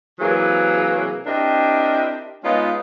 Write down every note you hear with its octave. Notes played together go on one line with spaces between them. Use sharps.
C3 E3 F#3 A#3 G#4
C4 D4 E4 G4 A#4 D#5
G#3 B3 C#4 D#4 F4